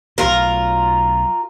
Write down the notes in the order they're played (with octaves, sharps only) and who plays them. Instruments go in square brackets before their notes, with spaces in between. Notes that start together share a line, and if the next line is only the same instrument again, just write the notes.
[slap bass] B1 A2 [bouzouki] F4 A#4